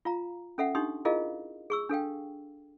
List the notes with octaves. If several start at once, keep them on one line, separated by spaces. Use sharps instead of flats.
F4 F5 A#5
C#4 A4 E5 F#5
D4 D#4 G4 C6 D#6
E4 F4 G#4 A#4 D#5 F5
G#4 C#6 E6
D4 A4 F5 G5